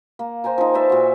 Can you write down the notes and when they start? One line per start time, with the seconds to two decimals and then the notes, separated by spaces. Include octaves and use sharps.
0.19 A#3
0.44 C5 G5 G#5 A#5
0.58 F3 D#4
0.74 B4 C5 D5 E5
0.90 A#2 F#4